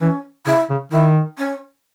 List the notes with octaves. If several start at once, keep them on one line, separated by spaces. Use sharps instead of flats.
E3 C#4
C#3 E4
C#3
D#3 E4
C#4